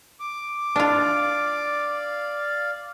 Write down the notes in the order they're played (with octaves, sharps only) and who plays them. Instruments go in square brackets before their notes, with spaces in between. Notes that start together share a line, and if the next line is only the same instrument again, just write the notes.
[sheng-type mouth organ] D6
[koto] D4 F4 [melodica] D5 F5